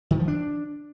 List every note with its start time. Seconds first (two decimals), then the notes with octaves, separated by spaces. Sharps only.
0.11 D#3
0.19 F3
0.28 D4